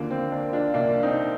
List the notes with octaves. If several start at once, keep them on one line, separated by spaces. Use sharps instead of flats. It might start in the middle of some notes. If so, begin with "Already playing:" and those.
Already playing: D#2 D3 F3 A#3
C4
A#3 D4
D4 F4
C2 A#2 F3 A#3 D4
C4 D#4